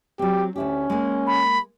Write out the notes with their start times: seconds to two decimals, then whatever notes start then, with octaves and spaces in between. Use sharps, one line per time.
0.19 F#3 C4 G4
0.56 D2 C#4 E4 G4
0.90 G#3 A#3
1.27 B5